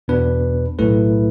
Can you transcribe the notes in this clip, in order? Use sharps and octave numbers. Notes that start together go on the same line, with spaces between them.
E2 B2 B3 D4 B4
B1 A2 A3 E4 B4